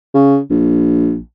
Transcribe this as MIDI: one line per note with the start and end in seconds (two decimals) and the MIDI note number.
0.14 0.39 49
0.50 1.18 34